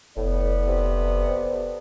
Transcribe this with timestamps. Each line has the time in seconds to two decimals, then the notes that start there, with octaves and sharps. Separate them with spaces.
0.17 F1 A2 B3 A4 D5
0.67 C3